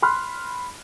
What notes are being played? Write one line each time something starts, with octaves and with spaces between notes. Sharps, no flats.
B5 C6 F6 F#6